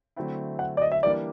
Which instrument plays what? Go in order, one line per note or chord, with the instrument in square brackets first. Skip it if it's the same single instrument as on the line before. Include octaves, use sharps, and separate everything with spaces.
[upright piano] D3 F#3 A3 C4 E4
[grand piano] F#5
D5
D#5
E5
[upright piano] E3 G3 A#3 D4 [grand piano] D5